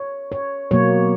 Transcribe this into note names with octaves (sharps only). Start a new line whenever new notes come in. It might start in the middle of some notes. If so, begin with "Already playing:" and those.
Already playing: C#5
C#5
B2 F#3 A#3 C#5